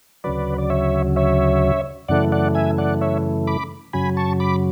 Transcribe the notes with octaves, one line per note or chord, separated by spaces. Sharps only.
D2 C#3 F#3 B4 D5
D5
C#5 E5
C#5 E5
F#2 C#3 E3 A3 D5 F#5
D5 F#5
E5 G#5
D5 F#5
C#5 E5
B5 D6
F#2 C#3 F#3 G#5 B5
A5 C#6
B5 D6